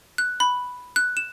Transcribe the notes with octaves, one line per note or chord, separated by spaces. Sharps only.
F#6
B5
F#6
E7